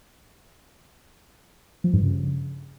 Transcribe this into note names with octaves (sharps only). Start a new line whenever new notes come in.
F3
G2
C#3